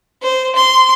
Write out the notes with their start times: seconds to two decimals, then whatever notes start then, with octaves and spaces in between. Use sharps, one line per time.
0.22 C5
0.55 C6